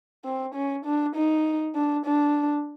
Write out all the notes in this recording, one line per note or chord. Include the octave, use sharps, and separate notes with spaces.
C4
C#4
D4
D#4
D4
D4